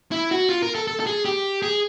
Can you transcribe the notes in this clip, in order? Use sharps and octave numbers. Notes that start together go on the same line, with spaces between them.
E4
F#4
F4
A#4
A4
A4
A4
G#4
G4
G#4